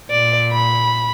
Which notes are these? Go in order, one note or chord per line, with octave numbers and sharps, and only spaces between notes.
A#2 D5
B5